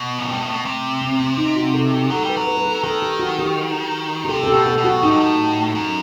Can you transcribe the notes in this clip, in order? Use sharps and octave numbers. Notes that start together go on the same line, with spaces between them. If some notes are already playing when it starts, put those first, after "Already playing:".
Already playing: B2
F#2
G2
A2
B2
C3 A3
C4
C4
D#4
F#4
A4
G4
F#3 A4
G3 B4
F#3
B4
B4
A4
D#3 A4
G4
F#4
G4
G4
C3 A4
A4
G4
B2
A4
B2
F#4
A2 D#4
G2
A2
F#2